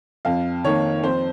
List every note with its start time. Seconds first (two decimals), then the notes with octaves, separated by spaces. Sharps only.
0.25 F2 F5
0.64 D#3 A#3 C#5
1.03 F2 C5